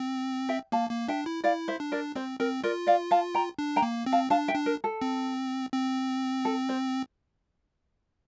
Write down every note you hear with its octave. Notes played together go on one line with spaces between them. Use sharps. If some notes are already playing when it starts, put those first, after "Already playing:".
Already playing: C4
E5 G5
A#3 F5 A5
A#3
D4 E5 G5
E4
E4 D5 F5
C5 E5
D4
A#4 D5
C4 C5
C4 A#4
F4 A#4 D5
D5 F5
F5 A5
G5 A#5
D4
G5 A#5
A#3
C4
F5 A5
D4 F5 A5
E5 G5
D4
A#4
A4
C4
C4
A4
C5